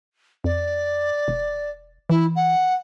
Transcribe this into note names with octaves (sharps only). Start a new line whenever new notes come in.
F2 D5
E1
E3 E4
F#5